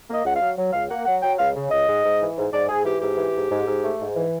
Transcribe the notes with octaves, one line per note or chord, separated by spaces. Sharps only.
A#3 D#5
C#2 F#5
F5
F#3
F#3
C#2 F5
A#3 F#5
F#3 F#5
F#3 G5
C#2 F5
C#3
C#2 D#5
G#2
G#2
E3
G#2
G#2 D5
G#2 G#4
E3 G4
G#2 G4
E3
G#2
G#2
G#2
A3
G#2
E3